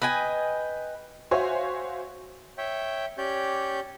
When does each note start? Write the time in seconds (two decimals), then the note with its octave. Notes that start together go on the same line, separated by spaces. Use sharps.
0.02 B4 D#5 G5 G#5
1.31 F#4 C5 C#5 E5 F5 G#5
2.58 C#5 E5 G5
3.18 C#4 G4 C#5 D5 G6